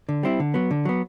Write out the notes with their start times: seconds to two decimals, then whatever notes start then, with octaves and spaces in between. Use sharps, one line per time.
0.09 D3
0.23 G3 C4 E4
0.40 D3
0.54 F#3 B3
0.71 D3
0.85 F#3 B3